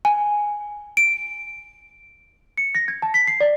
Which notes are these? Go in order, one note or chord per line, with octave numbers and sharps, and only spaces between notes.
G#5
D7
C#7
A#6
G#6
A5
B6
C7
D5